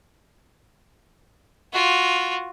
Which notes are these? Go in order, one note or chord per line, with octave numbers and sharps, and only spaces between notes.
F4 F#4